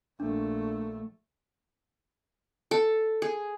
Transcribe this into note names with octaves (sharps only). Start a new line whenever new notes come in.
A#1 A3 D4
A4
G#4